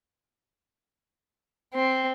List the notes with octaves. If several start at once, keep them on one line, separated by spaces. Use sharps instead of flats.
C4